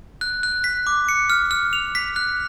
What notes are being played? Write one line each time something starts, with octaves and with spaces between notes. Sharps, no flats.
F#6
F#6
B6
D6
C#7
F6
F6
F7
B6
F#6